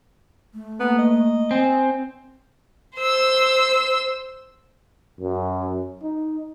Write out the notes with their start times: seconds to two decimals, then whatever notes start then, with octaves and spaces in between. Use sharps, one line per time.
0.54 A3
0.80 A#3 B3
0.99 D#5
1.51 C4 G#5
2.97 C5 E6
5.20 F#2
6.03 D#4